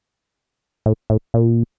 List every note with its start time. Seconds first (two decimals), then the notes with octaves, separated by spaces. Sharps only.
0.86 A2
1.10 A2
1.34 A#2